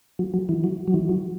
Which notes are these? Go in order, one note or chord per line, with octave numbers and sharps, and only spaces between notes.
F#3
F#3
E3
F#3
F#3
E3
F#3